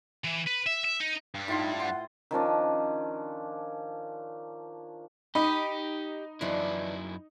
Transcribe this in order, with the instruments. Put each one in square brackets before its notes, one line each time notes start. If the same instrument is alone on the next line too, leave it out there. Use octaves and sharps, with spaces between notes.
[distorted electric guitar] E3
B4
E5
E5
D#4
G2 G3
[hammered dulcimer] A2 F4 C6 [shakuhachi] D#4
[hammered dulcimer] C5 [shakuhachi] F#5
[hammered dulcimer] D#3 F3 C#4 D4
[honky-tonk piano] D#4 [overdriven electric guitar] G4 [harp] B5 D#6
[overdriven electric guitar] F#2 E4 [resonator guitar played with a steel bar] E3 F3 D4